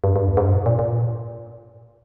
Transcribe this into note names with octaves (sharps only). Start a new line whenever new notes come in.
G2
G2
E2
G#2
G2
A#2
A#2
A#2